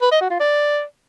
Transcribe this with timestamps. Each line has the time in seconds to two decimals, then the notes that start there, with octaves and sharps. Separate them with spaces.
0.02 B4
0.11 D#5
0.21 F#4
0.30 F4
0.40 D5